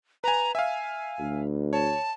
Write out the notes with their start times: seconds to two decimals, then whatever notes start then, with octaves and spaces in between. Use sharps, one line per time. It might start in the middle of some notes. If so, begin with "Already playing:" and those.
0.24 B4 G#5 A#5
0.55 E5 F5 G#5
1.19 D2
1.73 C#5 A5